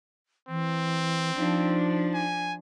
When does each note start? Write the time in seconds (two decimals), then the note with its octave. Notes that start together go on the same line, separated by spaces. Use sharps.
0.49 E3 C4
1.37 F3 D4 D#4
2.14 G#5